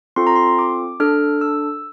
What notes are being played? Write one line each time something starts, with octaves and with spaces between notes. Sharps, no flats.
C4 F4 A4 C6
A#5
C6
D6
D4 A4 F6
E6